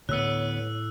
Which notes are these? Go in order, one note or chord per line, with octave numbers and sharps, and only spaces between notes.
D2 A2 B3 C#5 E6 F#6